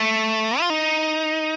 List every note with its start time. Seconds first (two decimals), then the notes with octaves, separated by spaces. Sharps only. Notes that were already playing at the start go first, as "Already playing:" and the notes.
Already playing: A3
0.60 F4
0.70 D#4